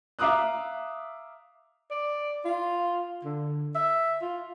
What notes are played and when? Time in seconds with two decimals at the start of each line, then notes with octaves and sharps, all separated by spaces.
0.19 E5 F5 A#5 D6 D#6 F#6
1.91 D5
2.45 F4
3.24 D3
3.75 E5
4.22 F4